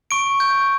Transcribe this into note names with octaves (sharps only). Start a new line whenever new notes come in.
C#6 D7
G6